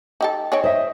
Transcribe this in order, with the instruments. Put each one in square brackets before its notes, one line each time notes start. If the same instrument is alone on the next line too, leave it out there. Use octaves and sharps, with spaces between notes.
[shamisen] D#4 G4 A4
[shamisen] C4 D#4 G#4 [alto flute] C#5
[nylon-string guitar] C5 E5 [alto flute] D#5